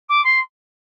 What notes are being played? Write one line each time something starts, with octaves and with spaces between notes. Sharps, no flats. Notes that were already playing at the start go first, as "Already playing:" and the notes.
D6
C6